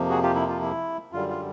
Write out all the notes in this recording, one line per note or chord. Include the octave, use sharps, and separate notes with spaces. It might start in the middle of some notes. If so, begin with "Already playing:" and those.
Already playing: F2 C3 F3 A#3
F#4 G#4
F4 G4
E4
F4
E4
F#2 D3 G3 F4
F4